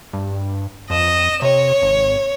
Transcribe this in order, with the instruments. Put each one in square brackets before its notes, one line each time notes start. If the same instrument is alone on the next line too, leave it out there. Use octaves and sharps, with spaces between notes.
[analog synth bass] G2
[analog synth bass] F2 [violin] D#5 E7
[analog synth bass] C3 [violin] C#5
[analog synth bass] G#1